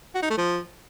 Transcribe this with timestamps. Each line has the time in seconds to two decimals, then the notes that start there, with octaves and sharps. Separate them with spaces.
0.15 F#4
0.22 D#4
0.30 A3
0.38 F3